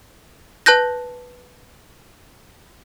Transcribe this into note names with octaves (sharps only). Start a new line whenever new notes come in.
B4 A5 F#6 G6 A#6